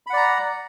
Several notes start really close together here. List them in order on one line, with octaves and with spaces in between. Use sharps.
B5 F#5 D5 A#5